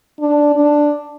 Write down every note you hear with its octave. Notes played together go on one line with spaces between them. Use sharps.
D4
D4